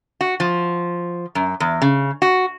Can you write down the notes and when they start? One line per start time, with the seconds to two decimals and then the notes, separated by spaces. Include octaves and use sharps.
0.21 F#4
0.40 F3
1.35 F#2
1.60 E2
1.82 C#3
2.22 F#4